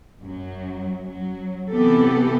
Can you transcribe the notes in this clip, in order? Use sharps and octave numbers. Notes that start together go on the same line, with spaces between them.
F#2 F#3
F#3
C3 E3 B3 G4 A4